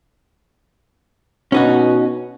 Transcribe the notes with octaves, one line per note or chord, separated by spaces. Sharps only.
B2 C#4 D#4 F#4